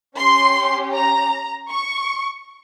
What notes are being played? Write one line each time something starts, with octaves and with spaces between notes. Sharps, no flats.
C#4 G4 C6
A#5
C#6